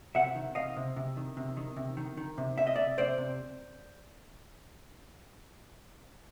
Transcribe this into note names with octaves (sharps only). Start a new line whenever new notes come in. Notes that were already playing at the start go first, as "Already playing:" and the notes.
C3 E5 F#5
D#3
C3 D#5 F5
C3
C3
D#3
C3
D#3
C3
D#3
D#3
C3
C3 E5
D#5
C3 D5 E5
C3 C5 D5
C3